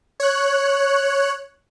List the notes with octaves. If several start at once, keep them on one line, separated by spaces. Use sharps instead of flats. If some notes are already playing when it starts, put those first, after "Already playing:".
C#5 F#6